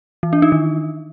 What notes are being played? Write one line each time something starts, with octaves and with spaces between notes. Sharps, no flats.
E3
D4
D#4
D#3